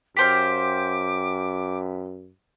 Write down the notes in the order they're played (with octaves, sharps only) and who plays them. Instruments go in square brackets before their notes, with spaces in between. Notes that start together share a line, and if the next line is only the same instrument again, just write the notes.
[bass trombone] F#2 [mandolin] G4 C5 F5 [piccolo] D6 [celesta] B6